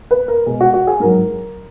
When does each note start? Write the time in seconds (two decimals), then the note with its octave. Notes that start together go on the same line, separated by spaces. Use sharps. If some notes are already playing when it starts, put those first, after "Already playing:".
0.11 B4
0.28 A#4
0.46 B2 G#3 G#4
0.61 F#4
0.74 F#4
0.87 G#4
1.00 G#2 F#3 A#4